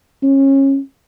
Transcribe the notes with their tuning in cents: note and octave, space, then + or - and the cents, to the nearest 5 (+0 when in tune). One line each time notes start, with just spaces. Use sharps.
C#4 -25